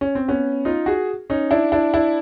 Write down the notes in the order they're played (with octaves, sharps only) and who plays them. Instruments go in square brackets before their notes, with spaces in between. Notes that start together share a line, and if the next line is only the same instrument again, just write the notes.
[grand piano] C#4
C4
B3 C#4
D#4 F4
F#4 G#4
C#4 D#4
D4 E4
D4 E4
D4 E4